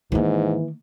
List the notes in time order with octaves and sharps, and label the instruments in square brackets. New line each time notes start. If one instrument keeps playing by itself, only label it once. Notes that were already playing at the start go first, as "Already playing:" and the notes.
[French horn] G#2 [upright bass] D#3 A#3 [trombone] E3